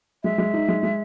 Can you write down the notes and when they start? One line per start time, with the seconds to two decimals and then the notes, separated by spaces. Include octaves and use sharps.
0.23 G#3 E5
0.38 G#3
0.54 D#4
0.68 G#3
0.83 G#3